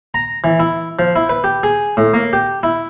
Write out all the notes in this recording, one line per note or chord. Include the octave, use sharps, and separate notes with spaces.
A#5
E3
E4
F3
E4
B4
G4
G#4
A2
A#3
G4
E4